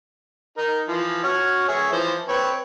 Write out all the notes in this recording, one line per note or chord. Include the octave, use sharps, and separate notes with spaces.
D#4 A#4
E3 F3
F#4 C#5 F6
G#4 C#5 E5
E3 F3 C5
C4 B4 C#5